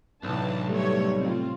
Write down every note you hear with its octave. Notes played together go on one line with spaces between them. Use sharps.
B1 A2 C3 E3 D4 A5
G3 A3 C#5
C4 F4